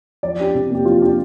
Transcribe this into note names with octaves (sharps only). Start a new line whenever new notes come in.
F3 D5
D4 G4
C3
A#3 G4
F3 F4
D4 G4